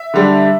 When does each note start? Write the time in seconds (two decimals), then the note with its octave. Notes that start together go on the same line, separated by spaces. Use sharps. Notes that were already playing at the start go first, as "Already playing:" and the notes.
Already playing: E5
0.14 D3 G3 D4